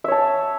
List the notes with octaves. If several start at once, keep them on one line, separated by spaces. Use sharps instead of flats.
C#5 E5 A5